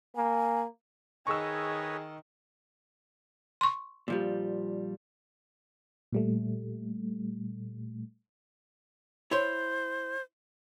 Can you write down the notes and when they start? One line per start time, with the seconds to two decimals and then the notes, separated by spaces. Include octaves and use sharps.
0.16 A#3 G#5
1.27 D#3 G#4 B4 C#5 D#5 C#6 E6
3.61 C6 C#6
4.08 A#2 F3 G3
6.12 A#2 G3 A3
9.31 E4 C5 C#5 C6